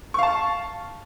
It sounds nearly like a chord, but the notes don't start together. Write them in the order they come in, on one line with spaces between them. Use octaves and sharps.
C#6 F5 A5